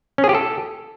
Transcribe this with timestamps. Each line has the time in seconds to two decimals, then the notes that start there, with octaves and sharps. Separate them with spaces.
0.18 C#4
0.24 G#4
0.29 G4
0.35 A4